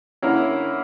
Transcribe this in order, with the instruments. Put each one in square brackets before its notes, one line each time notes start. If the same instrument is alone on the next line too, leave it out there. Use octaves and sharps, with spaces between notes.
[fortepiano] D3 A#3 C#4 E4 A#4